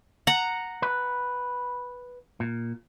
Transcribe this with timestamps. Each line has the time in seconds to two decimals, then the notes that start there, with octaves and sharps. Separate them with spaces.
0.27 F#5 A#5
0.82 B4
2.40 A#2